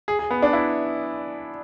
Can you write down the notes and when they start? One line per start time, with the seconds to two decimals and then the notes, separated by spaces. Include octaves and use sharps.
0.08 G#4
0.19 G#4
0.31 B3
0.42 D4
0.53 E4